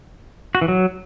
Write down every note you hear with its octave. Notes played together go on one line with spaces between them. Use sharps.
F#4
E3
F#3